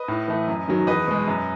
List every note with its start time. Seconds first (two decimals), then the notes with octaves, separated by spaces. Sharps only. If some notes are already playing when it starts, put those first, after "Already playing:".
Already playing: B4 D#5
0.08 A2
0.28 E3 A3
0.48 F#2
0.68 D#3 F#3
0.87 E2 B4 D#5
1.08 B2 G#3
1.27 F#2